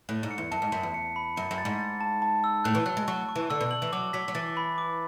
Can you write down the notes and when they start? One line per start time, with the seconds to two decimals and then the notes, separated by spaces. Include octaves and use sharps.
0.09 A2 F#6
0.23 G#2
0.31 C#7
0.38 E2
0.51 F#2 A5
0.62 G#2
0.72 F#2 B6
0.83 E2
0.94 C#7
1.16 B5
1.36 F#2 C#7
1.51 F#2
1.58 A6
1.65 G#2
1.79 A6
2.01 A5
2.22 A5
2.44 E6
2.64 A2 F#6
2.75 E3
2.86 F#3 F#6
2.97 G#3
3.08 F#3 C#6
3.29 C#6
3.36 E3
3.50 D3 E6
3.61 B2
3.71 F#7
3.82 E3
3.92 F#3 D6
4.13 F#3 B6
4.28 F#3
4.35 E3 A6
4.57 B5
4.78 D6